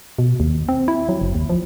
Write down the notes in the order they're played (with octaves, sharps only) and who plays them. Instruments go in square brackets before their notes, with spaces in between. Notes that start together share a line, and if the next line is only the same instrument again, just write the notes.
[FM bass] B2
D#2
C4
E4
F#3
F#1
D#2
F3